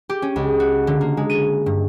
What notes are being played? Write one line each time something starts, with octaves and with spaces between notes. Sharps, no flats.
G4
C#4
C#2
F#4
D3
A#3
G#3
D#7
G2